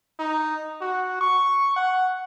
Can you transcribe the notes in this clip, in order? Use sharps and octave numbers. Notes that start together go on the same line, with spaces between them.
D#4
F#4
C#6
F#5